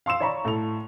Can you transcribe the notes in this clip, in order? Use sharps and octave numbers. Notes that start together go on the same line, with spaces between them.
F5 C6 E6 E7
C#5 D5 A#5 B5 C#6
A2 A4 F7